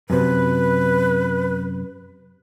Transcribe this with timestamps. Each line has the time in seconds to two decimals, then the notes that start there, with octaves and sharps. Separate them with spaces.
0.10 F#2 C3 B4